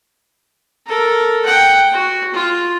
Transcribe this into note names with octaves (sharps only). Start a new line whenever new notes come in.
A4 A#4
F#5 G5
F#4
F4